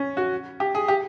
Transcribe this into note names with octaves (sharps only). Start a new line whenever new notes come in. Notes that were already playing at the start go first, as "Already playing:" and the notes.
Already playing: C#4
F#4
G4
G#4
G4